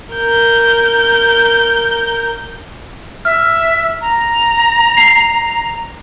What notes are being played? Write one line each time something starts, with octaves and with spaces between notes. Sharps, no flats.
A#4 G6
E5 F6
A#5
C7 F7